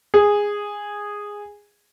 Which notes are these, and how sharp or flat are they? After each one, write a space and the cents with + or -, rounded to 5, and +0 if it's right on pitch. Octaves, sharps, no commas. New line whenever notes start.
G#4 -10